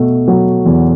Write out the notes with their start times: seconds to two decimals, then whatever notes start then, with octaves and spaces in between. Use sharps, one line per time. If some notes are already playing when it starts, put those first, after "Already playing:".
Already playing: B2 A3
0.28 F#3
0.66 E2